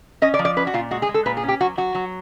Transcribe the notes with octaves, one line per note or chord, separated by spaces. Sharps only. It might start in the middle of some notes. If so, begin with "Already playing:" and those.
C#4 D#5
D5
F3
D5
C#4 B4
F#4
A#2 F4
G#3 F#4
G#4
G#3
A4
A#2 B4
G#4
C#4 G4
F#3 F#4
F#3 F#4
F#3